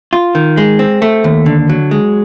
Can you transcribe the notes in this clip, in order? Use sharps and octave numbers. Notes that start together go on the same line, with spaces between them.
F4
D#3
G#3
C4
A3
D#2
D3
F#3
G#3